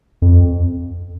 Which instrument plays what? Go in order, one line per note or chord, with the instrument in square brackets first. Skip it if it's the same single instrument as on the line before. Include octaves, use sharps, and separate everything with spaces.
[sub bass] F2